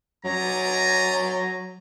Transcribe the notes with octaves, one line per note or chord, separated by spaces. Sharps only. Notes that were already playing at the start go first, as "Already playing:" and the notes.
F#3 D5 G#5 A#5